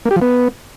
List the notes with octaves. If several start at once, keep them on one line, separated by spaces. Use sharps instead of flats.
A#3
G4
F3
B3